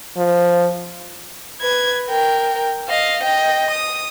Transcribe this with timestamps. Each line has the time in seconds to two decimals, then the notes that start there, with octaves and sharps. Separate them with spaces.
0.17 F3
1.62 B4 G#6
2.09 A#4 G5
2.88 D#5 F5
3.24 D#5 G5
3.71 D#6